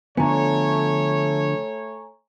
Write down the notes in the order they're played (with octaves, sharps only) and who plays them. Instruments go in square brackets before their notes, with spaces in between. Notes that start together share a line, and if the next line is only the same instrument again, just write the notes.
[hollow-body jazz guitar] D3 F3 B3 [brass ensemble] A3 C#5 [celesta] G#5 A#5